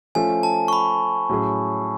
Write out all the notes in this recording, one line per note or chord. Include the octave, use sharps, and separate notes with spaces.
F3 A3 C#4 G#5
A5
C#6
B5
A2 F#3 C#4 G#4